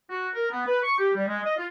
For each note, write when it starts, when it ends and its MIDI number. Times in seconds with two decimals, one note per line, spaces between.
0.10 0.28 66
0.35 0.47 70
0.52 0.62 59
0.67 0.78 71
0.83 0.94 85
0.99 1.10 67
1.15 1.26 55
1.27 1.39 56
1.44 1.52 75
1.57 1.65 65